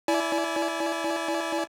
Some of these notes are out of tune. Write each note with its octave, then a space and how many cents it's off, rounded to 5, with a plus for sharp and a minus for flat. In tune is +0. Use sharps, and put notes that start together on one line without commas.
E4 +0 D5 -20 G#5 +30